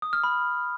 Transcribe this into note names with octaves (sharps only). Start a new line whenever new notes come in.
D#6
F6
B5